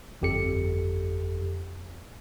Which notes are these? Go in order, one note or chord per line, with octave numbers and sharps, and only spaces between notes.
G1 F2 G4 A4 C#7